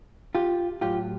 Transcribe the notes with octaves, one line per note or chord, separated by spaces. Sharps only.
F4 G4
A2 F#3 F4 G4